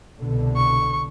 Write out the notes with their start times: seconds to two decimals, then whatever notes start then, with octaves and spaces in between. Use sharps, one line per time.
0.21 C2 B2 D3
0.56 C#6